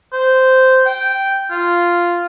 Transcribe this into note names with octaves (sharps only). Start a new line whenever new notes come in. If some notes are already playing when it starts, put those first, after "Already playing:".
C5
G5
F4